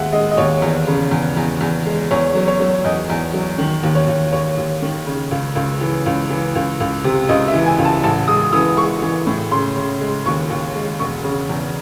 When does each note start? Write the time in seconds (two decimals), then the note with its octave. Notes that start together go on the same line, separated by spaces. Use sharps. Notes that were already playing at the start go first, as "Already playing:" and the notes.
Already playing: D#2 G#3 E5 F#5
0.13 G#3 D#5
0.31 D#5
0.37 D#2 C#5
0.62 E2
0.87 C#3
1.11 E2
1.37 E2
1.61 E2
1.86 G#3
2.11 E2 C#5
2.35 F#3
2.48 C#5
2.60 F#3
2.84 E2 D#5
3.10 E2
3.34 F#3
3.58 D#3
3.83 D#2
3.95 C#5
4.07 D#2
4.33 D#2 C#5
4.57 D#2
4.82 D#3
5.07 C#3
5.31 C#2
5.56 C#2
5.81 E3
6.06 C#2
6.30 E3
6.55 C#2
6.80 C#2
7.04 C3
7.29 C#2 D#5
7.48 E5
7.53 E3
7.66 G#5
7.78 C#2
7.85 A5
8.03 A1 A5
8.28 G#3 D#6
8.52 E3 D#6
8.77 G#3 C#6
9.02 E3
9.27 A2
9.51 C#3 C6
9.77 C#3
10.01 G#3
10.26 D#2 C#6
10.50 D#2
10.75 G#3
10.99 E1 C#6
11.24 C#3
11.49 E2